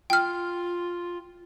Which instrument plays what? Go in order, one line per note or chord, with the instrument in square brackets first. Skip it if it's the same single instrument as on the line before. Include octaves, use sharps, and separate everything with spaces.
[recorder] F4 [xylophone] G5 F6